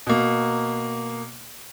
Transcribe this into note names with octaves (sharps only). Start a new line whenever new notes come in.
B2 A#3